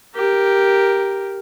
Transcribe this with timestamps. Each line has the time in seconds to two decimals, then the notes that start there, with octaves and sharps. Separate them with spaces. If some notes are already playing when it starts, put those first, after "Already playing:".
0.15 G4 A#4